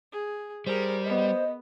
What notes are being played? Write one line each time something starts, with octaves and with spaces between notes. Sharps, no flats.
G#4
G3 G#4 A#4 C5
B3 D#5